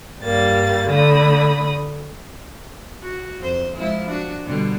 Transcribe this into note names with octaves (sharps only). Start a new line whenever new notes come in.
G2 G3 A#3 A6
D3 A3 B5 D#6
F#4
F2 C5
F3 G#3 E4
D4 F#4
B2 D3 G3